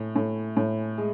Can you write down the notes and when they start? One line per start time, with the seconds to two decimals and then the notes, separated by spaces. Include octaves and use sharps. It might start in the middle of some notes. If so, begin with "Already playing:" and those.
Already playing: A2
0.16 A2
0.57 A2
0.98 G#3